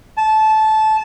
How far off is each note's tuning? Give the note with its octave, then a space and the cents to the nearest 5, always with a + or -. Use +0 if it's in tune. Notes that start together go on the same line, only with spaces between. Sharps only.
A5 -20